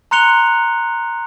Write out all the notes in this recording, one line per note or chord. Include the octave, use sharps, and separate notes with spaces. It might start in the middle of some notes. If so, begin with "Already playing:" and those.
A#5 C6 F#6 C#7 F7 G7